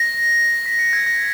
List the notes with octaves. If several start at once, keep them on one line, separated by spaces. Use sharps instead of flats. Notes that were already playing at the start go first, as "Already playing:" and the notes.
Already playing: A#6
B6
C#7
G#6
A#6